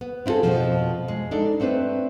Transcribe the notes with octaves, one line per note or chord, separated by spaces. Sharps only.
B3
C4 E4 F4 G#4 A4
F2 B2 F3
G#3
D4 D#4 A4 D5
A3 C4 D4 B4